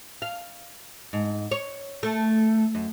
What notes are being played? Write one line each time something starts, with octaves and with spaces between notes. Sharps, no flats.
F5
G#2
C#5
A3
F#2